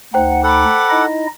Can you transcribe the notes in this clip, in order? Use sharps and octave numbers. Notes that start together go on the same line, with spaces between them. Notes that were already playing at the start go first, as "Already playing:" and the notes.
D2 D#4 C5 F#5 G5
A4 F#5 B5 D6
D#4 E4 D#5